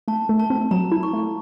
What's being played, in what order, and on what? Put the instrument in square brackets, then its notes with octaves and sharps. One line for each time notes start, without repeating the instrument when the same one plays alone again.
[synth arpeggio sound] A3 [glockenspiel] A5
[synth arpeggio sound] A3
[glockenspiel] A5
[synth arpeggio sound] C4
[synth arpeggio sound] F#3 [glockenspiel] A#5
[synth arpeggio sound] E4
[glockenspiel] C#6
[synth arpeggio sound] A3